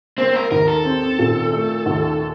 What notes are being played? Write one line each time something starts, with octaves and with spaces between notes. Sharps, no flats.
A#3 C4
A#4
D#2 A#4
A4
C4
A#2
A3
D#2